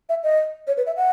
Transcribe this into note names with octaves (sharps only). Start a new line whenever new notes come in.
E5
D#5
C#5
B4
E5
F#5